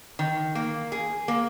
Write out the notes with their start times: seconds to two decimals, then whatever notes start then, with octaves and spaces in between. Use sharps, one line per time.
0.19 D#3
0.55 A#3
0.92 G#4
1.28 A#3